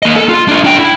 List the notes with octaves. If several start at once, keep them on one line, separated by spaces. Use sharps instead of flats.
A#3 D#5
A4
F4
D4 F4
D4 G5
E4